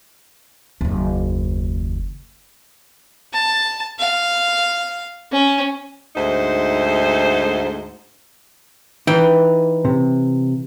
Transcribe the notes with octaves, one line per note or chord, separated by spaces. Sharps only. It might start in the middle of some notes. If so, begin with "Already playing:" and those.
F#1 D#2
A5
F5
C#4
D2 G#2 D#4 C5
E3 D#4 G5
C3